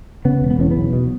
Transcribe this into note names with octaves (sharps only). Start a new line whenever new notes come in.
C#3 B3
E1
B3
E2 C#4
B3
B1
B2